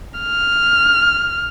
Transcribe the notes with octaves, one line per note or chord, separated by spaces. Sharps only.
F6